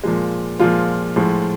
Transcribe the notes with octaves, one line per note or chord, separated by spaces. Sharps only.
A#2 F3 G#3
A#2 F3 G#3 F4
A2 F3 G#3